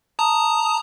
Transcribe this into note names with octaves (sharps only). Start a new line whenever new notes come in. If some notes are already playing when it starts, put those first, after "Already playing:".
A5 A#5 D#6